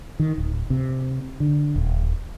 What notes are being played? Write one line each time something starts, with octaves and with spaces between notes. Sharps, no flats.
D#3
D1
C3
D3
D#1